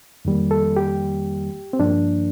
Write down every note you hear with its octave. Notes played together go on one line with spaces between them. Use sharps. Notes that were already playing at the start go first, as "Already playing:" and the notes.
F2 D#3 G3 A#3
A4
G4
C4
G2 F3 A#3 D4